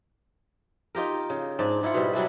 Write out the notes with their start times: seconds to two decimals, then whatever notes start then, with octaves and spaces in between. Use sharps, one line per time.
0.95 D#4 F4 G4 A#4
1.30 C#3
1.59 G#2 D4 D5
1.83 G#2 E4 F4 F#5
1.94 B2 G3
2.13 F#3 G3 D4 E4